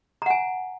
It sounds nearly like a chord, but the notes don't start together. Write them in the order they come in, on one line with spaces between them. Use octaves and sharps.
A#5 F#5 G#5